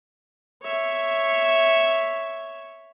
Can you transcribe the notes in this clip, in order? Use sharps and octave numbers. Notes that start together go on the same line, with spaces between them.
C#5 E5